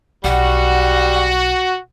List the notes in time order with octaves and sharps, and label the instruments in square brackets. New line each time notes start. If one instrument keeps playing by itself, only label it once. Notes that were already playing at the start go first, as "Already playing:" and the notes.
[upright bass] B1 [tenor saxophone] G3 [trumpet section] F#4 [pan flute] F#5